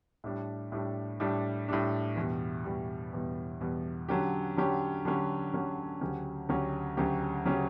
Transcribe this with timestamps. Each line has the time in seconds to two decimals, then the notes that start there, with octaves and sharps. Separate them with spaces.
0.24 A2 G3 D4
0.72 A2 G3 D4
1.20 A2 G3 D4
1.68 A2 G3 D4
2.16 E2 B2 G3
2.64 E2 B2 G3
3.13 E2 B2 G3
3.61 E2 B2 G3
4.09 D3 F#3 C#4 G4
4.57 D3 F#3 C#4 G4
5.05 D3 F#3 C#4 G4
5.53 D3 F#3 C#4 G4
6.01 D2 C#3 F#3 C#4 G4
6.49 D2 C#3 F#3 C#4 G4
6.97 D2 C#3 F#3 C#4 G4
7.45 C#3 F#3 C#4 G4